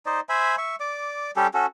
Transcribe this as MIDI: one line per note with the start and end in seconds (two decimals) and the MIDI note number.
0.06 0.20 63
0.06 0.20 72
0.06 0.20 74
0.06 0.20 75
0.29 0.56 72
0.29 0.56 76
0.29 0.56 80
0.29 0.56 83
0.58 0.76 76
0.58 0.76 85
0.80 1.31 74
0.80 1.31 86
1.36 1.47 55
1.36 1.47 61
1.36 1.47 67
1.36 1.47 69
1.54 1.66 61
1.54 1.66 66
1.54 1.66 69